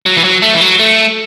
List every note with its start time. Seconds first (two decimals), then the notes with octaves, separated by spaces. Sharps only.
0.06 F#3
0.17 E3
0.24 F#3
0.42 A3
0.55 E3
0.61 F#3
0.79 A3